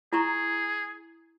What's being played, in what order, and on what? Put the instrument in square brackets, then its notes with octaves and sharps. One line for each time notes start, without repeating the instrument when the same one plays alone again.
[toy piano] E4 A#5 C#6 [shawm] G#4